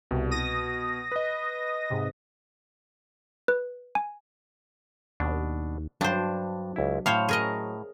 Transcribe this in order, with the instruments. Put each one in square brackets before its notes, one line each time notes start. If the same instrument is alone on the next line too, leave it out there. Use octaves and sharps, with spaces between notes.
[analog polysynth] C2 [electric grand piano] B2
[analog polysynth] D#6 A#6
[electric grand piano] B4 D#5
[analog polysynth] G#2 C3
[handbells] B4
G#5
[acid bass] D#2 [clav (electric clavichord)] B2 D4
[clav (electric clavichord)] G2 [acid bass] F#3 [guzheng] D4 C5
[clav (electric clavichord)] C#2 E4
[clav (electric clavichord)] A2 [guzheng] C5 C#5 F5
[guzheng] G#4 A#4 D#5